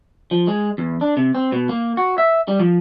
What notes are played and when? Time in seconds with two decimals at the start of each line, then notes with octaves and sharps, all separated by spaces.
0.31 F3
0.47 G#3
0.78 E2
1.01 D4
1.17 C3
1.35 C4
1.52 B2
1.69 A#3
1.97 F#4
2.18 E5
2.48 G3
2.59 F3